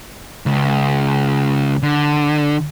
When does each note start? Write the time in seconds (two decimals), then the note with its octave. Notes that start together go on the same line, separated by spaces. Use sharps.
0.46 C#2
1.83 D3